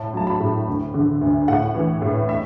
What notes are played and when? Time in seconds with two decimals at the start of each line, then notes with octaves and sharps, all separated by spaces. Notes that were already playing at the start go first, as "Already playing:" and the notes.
Already playing: A2 A5
0.14 F#3 A5
0.27 B5
0.40 A2
0.68 D2
0.94 D3
1.21 D2
1.48 A2 F#5
1.75 E3
2.02 A2
2.29 E5